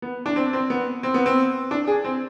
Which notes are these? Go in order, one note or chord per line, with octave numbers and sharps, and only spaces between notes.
B3
D4
C4
C4
B3
C4
B3
C4
D4
G#4
C4